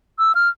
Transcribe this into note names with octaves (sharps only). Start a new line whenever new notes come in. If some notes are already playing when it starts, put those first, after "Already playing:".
E6
F6